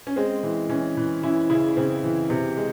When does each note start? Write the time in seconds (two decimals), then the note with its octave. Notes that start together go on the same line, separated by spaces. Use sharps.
0.07 C#4
0.16 G#3 C4
0.43 E3
0.69 E3 C#4
0.97 E3
1.23 E3 C#4 E4
1.50 C#3 E4 G#4
1.77 C#3 C4
2.04 E3
2.30 C3
2.57 G#3